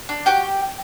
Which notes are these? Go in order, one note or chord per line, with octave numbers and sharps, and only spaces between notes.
D4
F#4 G4 G5